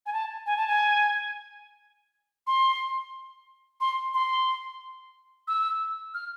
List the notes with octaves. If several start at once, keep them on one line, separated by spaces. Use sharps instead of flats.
G#5
A5
G#5
A5
G#5
C6
C6
C6
E6
F6